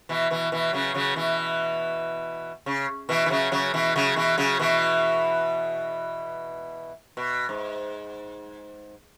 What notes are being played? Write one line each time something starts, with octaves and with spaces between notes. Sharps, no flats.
B2 E3
B2 E3
B2 E3
C#3 F#3
C#3 F#3
B2 E3
C#3
B2 E3
E3
C#3 F#3
C#3 F#3
B2 E3
C#3 F#3
B2 E3
C#3 F#3
B2 E3
B2
G#2